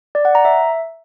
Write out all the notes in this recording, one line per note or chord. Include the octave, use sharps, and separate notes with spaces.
D5
F#5
A#5
E5